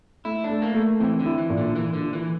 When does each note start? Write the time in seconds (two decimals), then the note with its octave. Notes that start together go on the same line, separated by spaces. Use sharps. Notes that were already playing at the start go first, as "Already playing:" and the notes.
0.25 A3 E4
0.44 D4
0.49 A3
0.62 A#3
0.74 A3
1.00 E3 C4
1.19 D3
1.26 E4
1.38 E3
1.50 A#2
1.57 D3
1.75 E3 A#3
1.93 D3
2.01 F4
2.13 E3